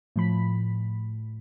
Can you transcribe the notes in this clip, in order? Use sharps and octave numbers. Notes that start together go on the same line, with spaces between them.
A2 F3 B5 B6